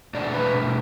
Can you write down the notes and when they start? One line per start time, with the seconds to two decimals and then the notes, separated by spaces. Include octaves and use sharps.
0.14 B2 A3 D4 D5
0.34 B4